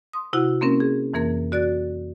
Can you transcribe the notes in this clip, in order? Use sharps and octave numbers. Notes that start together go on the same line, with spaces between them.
C6 D#6
C3 E4 F#4 F#5
A#3 C4 C#4 A#4
G#4
F2 E3 A#3 A#4 G#6
F#4 D5 F#6 A6